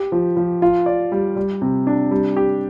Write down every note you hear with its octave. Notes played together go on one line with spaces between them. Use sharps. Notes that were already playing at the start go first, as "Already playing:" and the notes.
Already playing: G4
F3
F3
F4
D5
G3
G3
C3
D4
G3
G4